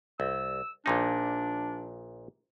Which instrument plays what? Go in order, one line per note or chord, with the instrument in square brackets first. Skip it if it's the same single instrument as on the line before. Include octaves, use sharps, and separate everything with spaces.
[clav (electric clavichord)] C2 [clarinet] E6
[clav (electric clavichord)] A#1 A#2 D#4 [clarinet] D4